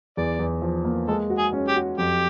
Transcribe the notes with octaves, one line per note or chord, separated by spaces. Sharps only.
E2 D5
E2
F3
A#3
G#3 A4
F#4
G#4
C#4
G4
F#4
F2 G4